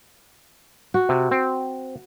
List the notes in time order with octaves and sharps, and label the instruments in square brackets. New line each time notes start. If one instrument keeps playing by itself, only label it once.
[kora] F#4
[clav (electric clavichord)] C3
C4